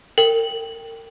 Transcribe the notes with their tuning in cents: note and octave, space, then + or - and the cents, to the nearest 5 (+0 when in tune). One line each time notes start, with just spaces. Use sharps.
A#4 -40 G5 +0